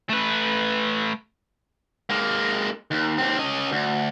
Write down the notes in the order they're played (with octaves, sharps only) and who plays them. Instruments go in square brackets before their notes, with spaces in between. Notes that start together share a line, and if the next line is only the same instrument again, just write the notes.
[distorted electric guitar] A3 B4
[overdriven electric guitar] G#3 A#3
D#2
D#2 C4
C#4 D#5
D2